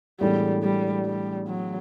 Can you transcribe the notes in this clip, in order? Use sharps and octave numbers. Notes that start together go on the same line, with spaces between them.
A2 E3 G3 G#3 B3 D4
G3
G3
F#3